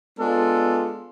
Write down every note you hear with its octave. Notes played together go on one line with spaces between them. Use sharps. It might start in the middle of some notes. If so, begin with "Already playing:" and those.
G#3 B3 D4 F4 A4